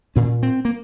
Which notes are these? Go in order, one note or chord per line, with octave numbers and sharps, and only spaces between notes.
A#2 C#4
C4
A#3